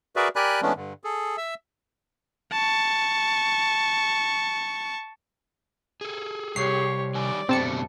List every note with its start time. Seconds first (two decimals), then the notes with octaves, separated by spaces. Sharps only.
0.16 F#4 G#4 A#4 B4 D5 E5
0.36 G4 A#4 D5 G#5 B5 F#6
0.62 E3 G#3 A3 B3 C#4 D4
0.76 G2 D3
1.04 G#4 A4
1.37 E5 E6
2.52 A5 C#6
6.01 G#4 A4
6.56 C2 G4 C#5 C7
7.15 D#3 G3 D5 G#5
7.49 F#2 B2 D3 A3 C4 G4 A5 C#7